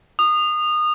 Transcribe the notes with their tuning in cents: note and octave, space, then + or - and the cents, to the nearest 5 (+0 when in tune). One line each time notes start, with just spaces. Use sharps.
D#6 -25